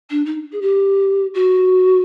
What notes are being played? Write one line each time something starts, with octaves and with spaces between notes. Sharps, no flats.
D4
D#4
G#4
G4
F#4